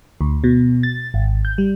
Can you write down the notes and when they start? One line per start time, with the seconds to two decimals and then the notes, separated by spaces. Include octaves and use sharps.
0.21 D2
0.44 B2
0.83 A6
1.14 G#1
1.45 G6
1.58 G3